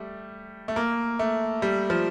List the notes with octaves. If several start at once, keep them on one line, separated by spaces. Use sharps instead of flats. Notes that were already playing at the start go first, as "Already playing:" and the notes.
Already playing: G3 A3
A3
A#3
A3
G3
F3